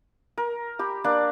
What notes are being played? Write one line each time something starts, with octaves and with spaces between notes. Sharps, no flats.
A#4
G4 B5
A#3 D4 D5